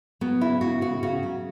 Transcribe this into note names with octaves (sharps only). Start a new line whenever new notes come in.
F#3 B3
C#3 E4
C#3 F#4
C#3 F#4
C#3 F#4
F#3